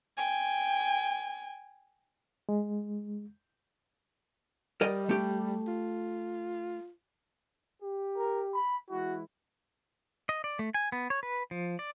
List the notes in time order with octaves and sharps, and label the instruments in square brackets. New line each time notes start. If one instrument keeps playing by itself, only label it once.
[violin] G5 G#5
[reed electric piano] G#3
[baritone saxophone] G3 [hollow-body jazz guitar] A#4 D5 D#5
[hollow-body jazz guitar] A3 G4
[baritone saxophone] F4
[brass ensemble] G4
[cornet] A#4
B5
[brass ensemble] E3 G#3 E4 [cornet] F#4
[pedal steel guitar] D#5
D5
A3
G#5
B3
C#5
B4
F3
D5